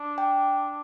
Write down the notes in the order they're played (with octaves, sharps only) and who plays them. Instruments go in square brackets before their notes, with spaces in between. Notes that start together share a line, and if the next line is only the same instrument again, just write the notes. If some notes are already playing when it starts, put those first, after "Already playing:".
Already playing: [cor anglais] D4
[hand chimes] G5